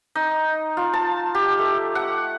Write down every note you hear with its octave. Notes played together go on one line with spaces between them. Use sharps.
D#4
F4
A5
G4
A3
F#5